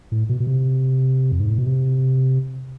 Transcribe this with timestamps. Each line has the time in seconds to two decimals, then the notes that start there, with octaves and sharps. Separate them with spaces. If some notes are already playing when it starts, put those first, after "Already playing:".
0.12 A2
0.29 B2
0.40 B2
0.47 C3
1.32 F2
1.40 G#2
1.49 A2
1.58 B2
1.66 C3